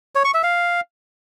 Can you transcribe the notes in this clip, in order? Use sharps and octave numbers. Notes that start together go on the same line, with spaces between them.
C#5
C#6
E5
F5